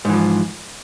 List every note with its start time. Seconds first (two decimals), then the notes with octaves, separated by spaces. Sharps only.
0.05 G#2
0.09 E3
0.13 F3